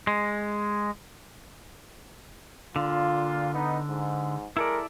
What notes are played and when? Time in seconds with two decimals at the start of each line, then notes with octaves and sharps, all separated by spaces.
0.07 G#3
2.76 A#2 D3 F4
3.54 B3 D#4
3.87 G#2
4.57 G#3 E4 A4 A#4 D5